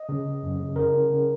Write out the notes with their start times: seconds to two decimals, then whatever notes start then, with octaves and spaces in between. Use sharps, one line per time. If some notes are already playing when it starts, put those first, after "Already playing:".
Already playing: D#5
0.09 C#3
0.25 C#3
0.43 F#2
0.59 C#3
0.76 C#3 A#4
0.94 C#3
1.10 C#3